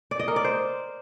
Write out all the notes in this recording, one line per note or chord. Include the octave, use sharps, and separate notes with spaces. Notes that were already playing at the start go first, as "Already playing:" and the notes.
D5
D#5
A#4
D5
C5